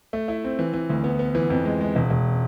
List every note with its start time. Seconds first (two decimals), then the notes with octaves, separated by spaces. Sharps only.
0.13 A3
0.28 E4
0.44 C4
0.59 E3
0.74 E3
0.90 D2
1.04 B3
1.19 B3
1.35 E3
1.50 F2
1.65 G#3
1.81 G#3
1.96 E1
2.10 E1